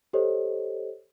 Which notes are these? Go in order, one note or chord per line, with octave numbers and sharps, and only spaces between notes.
G4 A4 C5 C#5 D#5